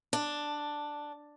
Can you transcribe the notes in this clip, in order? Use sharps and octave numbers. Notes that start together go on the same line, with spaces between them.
D4